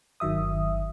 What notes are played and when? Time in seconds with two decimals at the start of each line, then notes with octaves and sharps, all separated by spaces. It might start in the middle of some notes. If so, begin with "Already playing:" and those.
0.20 G1 D#3 F#3 E5 D#6